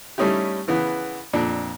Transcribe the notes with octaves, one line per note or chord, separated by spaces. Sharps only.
G3 A3 C#4 D#4 E4 G4
C#3 E3 B3
F2 A#2 D4